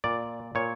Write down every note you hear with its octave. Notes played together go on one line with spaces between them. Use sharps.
A#2 D5
A#2 C#5